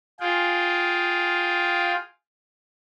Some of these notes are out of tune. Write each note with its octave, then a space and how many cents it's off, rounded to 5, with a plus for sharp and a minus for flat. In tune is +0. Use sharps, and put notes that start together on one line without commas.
F4 +5 G#4 +0 G5 +0